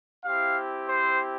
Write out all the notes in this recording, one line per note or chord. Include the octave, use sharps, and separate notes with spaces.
C4 E4 G4 F5
C5